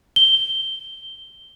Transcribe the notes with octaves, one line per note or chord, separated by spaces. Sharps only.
G7